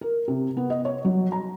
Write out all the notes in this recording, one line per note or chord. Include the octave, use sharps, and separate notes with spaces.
A#4
C3
B3
D#5
C#5
F#3
A#5